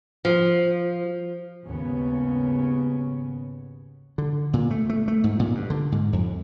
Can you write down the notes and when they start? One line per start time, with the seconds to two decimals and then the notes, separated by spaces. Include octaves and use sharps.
0.25 F3
1.65 G#1 D#2 C#3 B3 C#4
4.18 D3
4.53 A#2
4.71 A3
4.90 A3
5.08 A3
5.24 G#2
5.39 A#2
5.55 G2
5.70 D3
5.92 G#2
6.13 F2